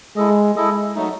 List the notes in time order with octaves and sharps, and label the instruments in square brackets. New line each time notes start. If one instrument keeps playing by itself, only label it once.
[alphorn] G#3 [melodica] E4 A4 D#5
[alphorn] G#3 [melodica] E4 A4 D#5
[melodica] F#3 A3 D#4